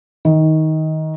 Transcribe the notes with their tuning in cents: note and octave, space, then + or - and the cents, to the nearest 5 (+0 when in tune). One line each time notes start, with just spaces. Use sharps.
D#3 +15